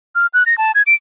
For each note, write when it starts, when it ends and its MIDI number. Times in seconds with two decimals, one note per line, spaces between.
0.15 0.27 89
0.34 0.43 90
0.46 0.57 94
0.58 0.72 81
0.75 0.82 92
0.87 0.94 98